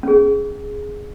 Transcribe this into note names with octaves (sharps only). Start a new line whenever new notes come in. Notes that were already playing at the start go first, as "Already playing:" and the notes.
C#4 G#4